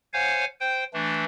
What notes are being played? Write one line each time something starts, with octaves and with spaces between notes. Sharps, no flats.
C5 C#5 F5 F#5 G#5
C5 G5
E3 A3 D4